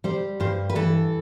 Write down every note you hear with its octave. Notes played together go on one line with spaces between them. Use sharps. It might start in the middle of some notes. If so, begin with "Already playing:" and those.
G3 C5
G2 C5
B4
E3 A4